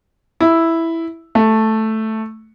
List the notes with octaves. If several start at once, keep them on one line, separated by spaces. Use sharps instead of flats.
E4
A3